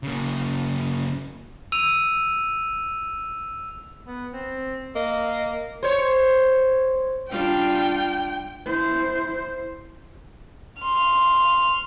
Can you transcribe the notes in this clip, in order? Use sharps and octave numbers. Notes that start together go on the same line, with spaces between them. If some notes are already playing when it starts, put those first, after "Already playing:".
C#3 A#3
E6 D#7 F7
B3
C4
A#3 D#5
C5 C#5
G3 D4 F4 G5
E4 C5
C6 F6